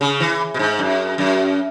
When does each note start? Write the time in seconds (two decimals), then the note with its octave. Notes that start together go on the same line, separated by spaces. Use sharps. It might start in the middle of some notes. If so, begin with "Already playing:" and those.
0.01 C#3
0.20 E3
0.54 B2
0.59 G#2
0.79 F#2
1.18 F#2